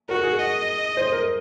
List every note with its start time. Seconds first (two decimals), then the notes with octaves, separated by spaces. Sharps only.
0.09 F#4 A#4
0.23 G#4
0.39 D#5
0.97 C5
1.12 A#4